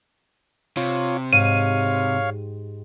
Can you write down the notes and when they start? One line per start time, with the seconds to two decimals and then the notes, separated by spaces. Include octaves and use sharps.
0.77 C3 F4 C#5
1.33 G#2 G4 C#5 F5 D#7